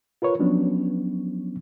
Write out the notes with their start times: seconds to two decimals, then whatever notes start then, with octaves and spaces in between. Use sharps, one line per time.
0.22 F4 A#4 B4 C#5
0.39 F3 F#3 B3 C#4 D4